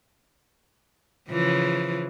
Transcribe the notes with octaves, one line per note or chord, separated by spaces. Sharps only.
C#3 E3 F3